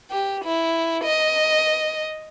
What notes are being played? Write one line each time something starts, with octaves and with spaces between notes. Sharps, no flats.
G4
E4
D#5